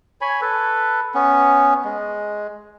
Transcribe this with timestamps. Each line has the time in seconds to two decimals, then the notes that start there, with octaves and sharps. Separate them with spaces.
0.21 C#5 G#5 B5
0.41 A4 B4
1.14 B3 C#4
1.85 G#3